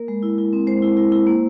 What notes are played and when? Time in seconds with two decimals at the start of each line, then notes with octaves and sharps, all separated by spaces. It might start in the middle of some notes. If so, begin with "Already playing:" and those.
Already playing: A#3 A#4
0.08 G#3
0.23 E4
0.38 E4
0.53 C4
0.67 G#3 C5
0.82 E4
0.97 E4
1.12 E4
1.27 A#3